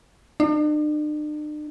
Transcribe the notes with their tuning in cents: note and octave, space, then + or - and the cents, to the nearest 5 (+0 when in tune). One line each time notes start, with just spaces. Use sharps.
D4 +45